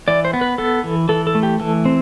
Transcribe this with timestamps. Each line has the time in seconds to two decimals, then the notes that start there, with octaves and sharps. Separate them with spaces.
0.08 E3 D5
0.25 C5
0.33 B3
0.41 B4
0.58 B3 A4
0.84 E3
1.09 E3 A4
1.27 A4
1.35 A3
1.43 G4
1.60 E3 A4
1.85 C4